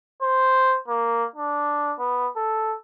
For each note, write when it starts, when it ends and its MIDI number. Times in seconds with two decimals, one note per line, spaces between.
0.22 0.78 72
0.88 1.26 58
1.36 1.94 62
1.99 2.29 59
2.36 2.75 69